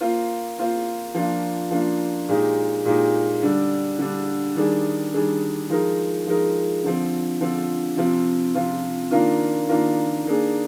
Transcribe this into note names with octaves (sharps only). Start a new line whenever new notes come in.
A#3 F4 C5
A#3 F4 C5
F3 A#3 D4 F4
F3 A#3 D4 F4
A#2 G#3 D#4 G4
A#2 G#3 D#4 G4
D3 G3 D4
D3 G3 D4
D#3 G3 D4 G#4
D#3 G3 D4 G#4
F3 G#3 D#4 A#4
F3 G#3 D#4 A#4
D3 F3 C4
D3 F3 C4
C3 F3 C4 F4
C3 F3 C4 F4
D#3 A#3 D4 F4 A#4
D#3 A#3 D4 F4 A#4
D#3 A#3 D4 G#4